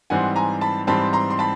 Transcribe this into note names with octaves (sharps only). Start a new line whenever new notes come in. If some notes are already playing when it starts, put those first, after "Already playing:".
G#2 E3 G3 C4 F#5 G#5
G#5 A#5
A5 B5
G#2 E3 G3 C4 A5 B5
A#5 C6
C6
A5 B5